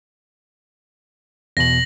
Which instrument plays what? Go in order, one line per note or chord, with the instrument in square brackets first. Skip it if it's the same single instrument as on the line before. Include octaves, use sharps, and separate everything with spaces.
[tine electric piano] E2 B2 [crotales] A#6 F#7